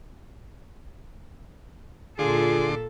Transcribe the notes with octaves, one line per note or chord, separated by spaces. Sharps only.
A#2 D3 F4 G#4 A4 C6 D6